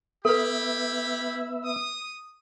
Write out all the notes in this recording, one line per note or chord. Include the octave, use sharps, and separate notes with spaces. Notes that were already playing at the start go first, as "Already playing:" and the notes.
B3 E4 G4 A4 B4 E5 B5
D#6